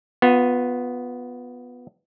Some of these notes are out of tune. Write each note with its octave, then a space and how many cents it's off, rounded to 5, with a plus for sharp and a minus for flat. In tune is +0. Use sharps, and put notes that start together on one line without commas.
B3 +0 F4 +25